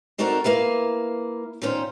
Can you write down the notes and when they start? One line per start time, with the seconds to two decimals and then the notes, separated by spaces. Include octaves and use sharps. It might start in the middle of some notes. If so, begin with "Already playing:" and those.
0.18 C4 D4 D#4 F#4 A4 A#4
0.44 A#3 E4 B4 F5
1.62 A#2 D#3 C#4 C5